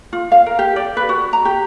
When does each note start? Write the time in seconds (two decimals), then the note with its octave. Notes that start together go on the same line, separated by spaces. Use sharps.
0.13 F4
0.32 F5
0.46 A#4
0.59 G4
0.76 D5
0.97 B4
1.09 F#4
1.33 A#5
1.45 G4